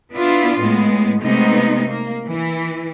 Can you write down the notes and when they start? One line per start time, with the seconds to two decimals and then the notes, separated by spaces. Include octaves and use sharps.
0.12 B3 D4 E4 F4
0.59 A2 G#3 B3
1.21 C3 G#3 A3 B3 D#4
1.88 A#3
2.27 E3